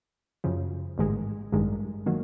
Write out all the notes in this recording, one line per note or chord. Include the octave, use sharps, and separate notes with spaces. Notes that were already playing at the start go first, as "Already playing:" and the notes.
F#2 C#3 F3
A1 G#2 D#3 G#3
A1 G2 D#3 G#3
D#3 F#3 A#3